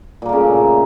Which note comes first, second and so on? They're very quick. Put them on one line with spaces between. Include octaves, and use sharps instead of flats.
A#2 A#3 A3 C#3